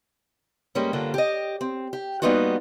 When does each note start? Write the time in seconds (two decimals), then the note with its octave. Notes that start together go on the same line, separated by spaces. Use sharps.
0.75 G2 G3 G#3 A#3 C#4
0.93 G2 D3 A#3 F4 A4
1.14 G4 D#5
1.61 C4
1.93 G4
2.22 G3 A#3 B3 D#4 F4 F#4